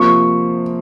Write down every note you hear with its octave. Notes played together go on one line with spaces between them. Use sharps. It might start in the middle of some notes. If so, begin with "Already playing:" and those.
Already playing: C3 F3 A#3 F4 C#6